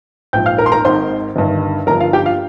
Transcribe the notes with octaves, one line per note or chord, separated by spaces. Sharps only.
A#1 G#2 F3 G5 G6
F5 F6
A#4 A#5
C6
A#4 A#5
G#1 G#2 D#3 C5 C6
G1 G2 D#3
G1 G2 F3 A#4 A#5
F4 F5
G4 G5
F4 F5